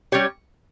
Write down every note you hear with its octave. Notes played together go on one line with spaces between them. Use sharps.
G3 C#4 G4 C#5